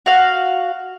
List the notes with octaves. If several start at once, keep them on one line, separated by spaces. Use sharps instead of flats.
F#4 F5